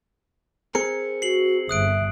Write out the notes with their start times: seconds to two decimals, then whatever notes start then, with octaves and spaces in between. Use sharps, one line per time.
0.75 C4 G#4 A#4 C#7
1.22 F#4 C7 F#7
1.69 G1 E5 D#6 F#6 D7